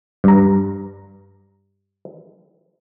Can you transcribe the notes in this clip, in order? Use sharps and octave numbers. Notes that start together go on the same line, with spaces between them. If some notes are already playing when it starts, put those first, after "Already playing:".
G2 A#5